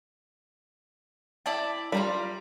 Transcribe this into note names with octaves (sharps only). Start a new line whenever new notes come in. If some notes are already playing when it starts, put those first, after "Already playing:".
E4 D5 A5
G3 F4 A#5 B5